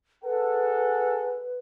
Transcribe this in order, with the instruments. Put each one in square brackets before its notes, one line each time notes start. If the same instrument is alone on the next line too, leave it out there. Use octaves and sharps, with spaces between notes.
[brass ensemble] G#4 A4 F#5 [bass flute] B4